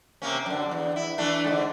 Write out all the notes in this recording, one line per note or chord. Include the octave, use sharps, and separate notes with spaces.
C3 A#3 C#4
F#2 D3
E2
E4
E3 A3 D4
G#2 D3